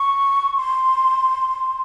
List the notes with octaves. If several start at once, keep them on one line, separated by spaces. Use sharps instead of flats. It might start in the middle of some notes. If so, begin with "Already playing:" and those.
Already playing: C#6
C6